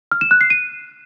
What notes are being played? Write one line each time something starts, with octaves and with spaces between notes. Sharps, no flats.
F6
E7
F#6
C7
D#7